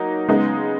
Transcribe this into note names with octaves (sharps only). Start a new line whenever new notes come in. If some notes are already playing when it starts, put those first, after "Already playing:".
Already playing: F#3 A#3 D#4 F#4 A#4
C#3 G#3 B3 D#4